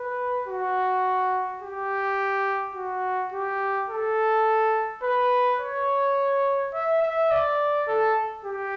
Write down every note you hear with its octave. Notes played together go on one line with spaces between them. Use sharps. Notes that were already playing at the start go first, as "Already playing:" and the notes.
Already playing: B4
F#4
G4
F#4
G4
A4
B4
C#5
E5
E5
D5
A4
G4